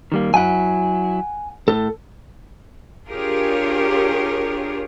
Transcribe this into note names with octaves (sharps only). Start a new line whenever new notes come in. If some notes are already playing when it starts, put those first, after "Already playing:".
D#3 G3 A#3
F#3 E4 F#5 G#5
A2 A4
D4 F4 G4 G#4 A#4 C#5